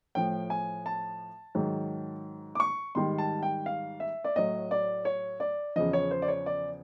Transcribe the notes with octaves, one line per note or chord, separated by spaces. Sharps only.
A2 F3 G5
G#5
A5
G#2 D#3 F#3
D6
C#6
G#2 D#3 G3 C6
A5
G5
F5
E5
D5
A2 F#3 D#5
D5
C#5
D5
E2 C#3 F3 D#5
C#5
C5
D5
C#5
D5